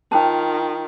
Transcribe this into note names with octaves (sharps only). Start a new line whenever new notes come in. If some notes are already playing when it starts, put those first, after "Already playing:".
D#3 F4 C5 G5 A5